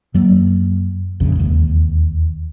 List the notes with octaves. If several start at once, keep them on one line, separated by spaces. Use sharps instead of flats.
F#2 F#3 A#3
A#1 F2 C#3
E1 D#2